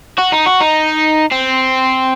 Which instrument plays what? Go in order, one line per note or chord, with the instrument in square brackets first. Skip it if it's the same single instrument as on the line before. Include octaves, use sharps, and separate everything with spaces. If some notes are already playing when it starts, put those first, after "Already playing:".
[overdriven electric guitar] F#4
D#4
F#4
D#4
C4